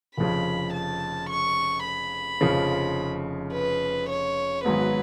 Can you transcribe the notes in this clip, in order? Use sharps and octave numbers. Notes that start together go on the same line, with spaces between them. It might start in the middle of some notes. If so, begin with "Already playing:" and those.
F1 F2 C#3 B5
A5
C#6
B5
F1 F2 C#3 F3
B4
C#5
G#1 G#2 F#3 B3 B4